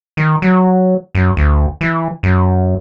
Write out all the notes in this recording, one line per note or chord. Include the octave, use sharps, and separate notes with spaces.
D#3
F#3
F#2
D2
E3
F#2